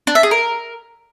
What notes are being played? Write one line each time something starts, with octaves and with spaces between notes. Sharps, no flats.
D4
E5
G#4
A#4